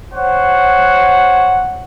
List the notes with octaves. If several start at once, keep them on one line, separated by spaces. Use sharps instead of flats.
C5 C#5 F#5